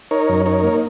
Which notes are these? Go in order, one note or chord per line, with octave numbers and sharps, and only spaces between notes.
D#4 A#4 C#5
F#2
D#4 A#4 C#5
A#3